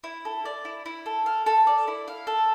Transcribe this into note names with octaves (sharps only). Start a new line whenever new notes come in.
E4
A4
D5
E4
E4
A4
F5
A4
D5
E4
F5
A4